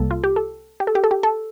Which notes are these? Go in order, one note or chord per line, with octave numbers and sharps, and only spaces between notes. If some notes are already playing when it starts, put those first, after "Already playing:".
Already playing: C2 C3 G3 A#3 A4
F4
G4
A4
G4
A4
G4
A4
G4
A4